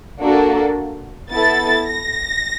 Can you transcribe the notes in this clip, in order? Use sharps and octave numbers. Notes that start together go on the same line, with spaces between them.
A#3 D4 F#4 A4
B3 E4 A4 A6
A#6